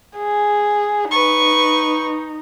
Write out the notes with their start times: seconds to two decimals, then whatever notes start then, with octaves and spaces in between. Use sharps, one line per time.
0.18 G#4
1.11 D#4 B4 C#6